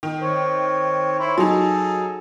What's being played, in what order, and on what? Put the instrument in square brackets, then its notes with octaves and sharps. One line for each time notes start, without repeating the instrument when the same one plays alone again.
[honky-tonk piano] D#3
[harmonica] C4 C#5
E4 C5 C#5
[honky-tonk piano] F#3 D#4 [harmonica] G#4 A4